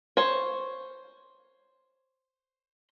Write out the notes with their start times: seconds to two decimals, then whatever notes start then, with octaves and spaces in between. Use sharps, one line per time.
0.17 C5 C#5